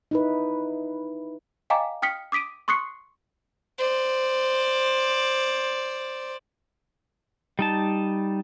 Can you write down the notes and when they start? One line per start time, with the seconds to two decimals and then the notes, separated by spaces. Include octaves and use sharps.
0.11 D#4 E4 B4
1.70 D#5 F5 G5 G#5 A#5 D6
2.02 G5 D#6 F6 B6 C#7
2.32 D6 D#6 B6 D7 D#7
2.68 C6 C#6 D#6 F#6 C7 C#7
3.79 C5 D5
7.59 G3 D#4 A5